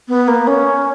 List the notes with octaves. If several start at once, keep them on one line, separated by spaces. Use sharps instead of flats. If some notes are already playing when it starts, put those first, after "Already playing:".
B3
A#3
C#4